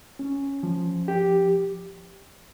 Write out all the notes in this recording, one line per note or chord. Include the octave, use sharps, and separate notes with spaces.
C#4
F3
G4